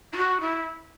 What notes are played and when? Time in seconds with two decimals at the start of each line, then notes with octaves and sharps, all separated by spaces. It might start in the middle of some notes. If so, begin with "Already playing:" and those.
0.12 E4
0.16 F#4
0.40 E4